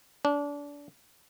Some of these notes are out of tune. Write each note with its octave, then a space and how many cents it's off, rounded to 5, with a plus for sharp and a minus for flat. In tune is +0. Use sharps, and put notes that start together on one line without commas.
D4 -25